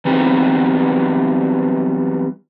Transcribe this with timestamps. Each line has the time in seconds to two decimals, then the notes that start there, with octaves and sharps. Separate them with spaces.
0.05 E3 F#3 G3 B3 C4 D#4